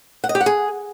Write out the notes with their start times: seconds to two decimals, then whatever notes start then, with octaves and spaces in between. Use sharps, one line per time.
0.24 F#5
0.29 D#5
0.35 G4
0.41 F#5
0.46 G#4